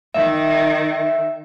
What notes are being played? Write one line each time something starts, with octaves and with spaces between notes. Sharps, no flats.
D#3 E5